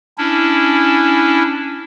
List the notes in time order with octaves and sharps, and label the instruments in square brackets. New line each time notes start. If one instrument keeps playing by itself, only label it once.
[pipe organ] C#4 D4 E4